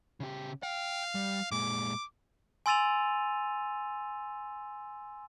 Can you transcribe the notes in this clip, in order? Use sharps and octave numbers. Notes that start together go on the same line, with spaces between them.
C#3 G4
F5 G5
G3
A#2 G#3 D6
G#5 C6 E6 A6 D#7 F7